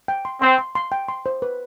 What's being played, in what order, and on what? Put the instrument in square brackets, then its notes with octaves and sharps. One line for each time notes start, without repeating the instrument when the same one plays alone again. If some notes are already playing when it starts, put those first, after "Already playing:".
[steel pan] G5
C6
[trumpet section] C4 [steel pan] C6
[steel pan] C6
C6
G5
C6
C5
B4